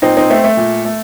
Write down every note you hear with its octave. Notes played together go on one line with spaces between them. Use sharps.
A#2 C4 D#4
C4 D#4
A3 C4
A3
A#2
A3